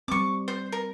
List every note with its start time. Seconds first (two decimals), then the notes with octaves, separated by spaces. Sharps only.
0.08 G3 C4 C#6 D6
0.48 C5
0.72 A#4